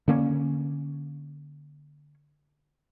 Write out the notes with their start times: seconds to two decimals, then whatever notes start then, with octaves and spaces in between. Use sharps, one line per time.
0.08 D3 A#3 C#4